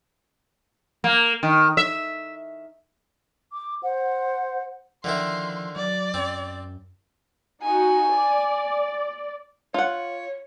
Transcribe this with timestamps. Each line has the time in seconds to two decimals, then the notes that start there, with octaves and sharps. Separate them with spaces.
1.04 A#3
1.43 D#3
1.77 E5
3.52 D6
3.83 C5 F#5
5.04 D3 D#3 F3 E4 C6
5.76 F#3 D5
6.14 F#2 C4
7.63 D#4 F#4 G#5
8.13 D5
9.74 F4 C#5 F#5